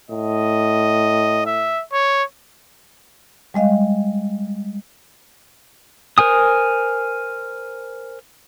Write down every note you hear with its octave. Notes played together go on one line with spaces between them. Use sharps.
A2 D#5
E5
C#5
G3 G#3 D#5 F5
A#4 C5 G#5 D#6